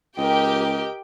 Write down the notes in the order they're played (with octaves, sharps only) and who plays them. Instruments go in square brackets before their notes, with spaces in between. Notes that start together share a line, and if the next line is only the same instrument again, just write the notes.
[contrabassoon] C#2 [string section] G4 G5 [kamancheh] A#4 D#5